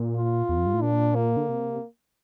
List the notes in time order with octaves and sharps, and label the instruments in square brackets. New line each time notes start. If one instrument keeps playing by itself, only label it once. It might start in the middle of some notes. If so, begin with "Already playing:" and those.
Already playing: [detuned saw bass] A#2
[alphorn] F4
[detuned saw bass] E2
F2
G2
A2
[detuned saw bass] A#2 [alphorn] D4
[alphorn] A#3
[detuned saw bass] D3
C3